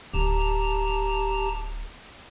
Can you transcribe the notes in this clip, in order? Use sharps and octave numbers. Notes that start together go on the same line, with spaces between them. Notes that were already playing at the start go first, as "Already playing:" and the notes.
D1 G4 A5 A#5